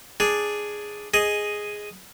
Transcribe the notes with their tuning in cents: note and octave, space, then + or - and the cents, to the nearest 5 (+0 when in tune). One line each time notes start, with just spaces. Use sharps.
D4 +0 G#4 +0
G#4 +0 D#5 +0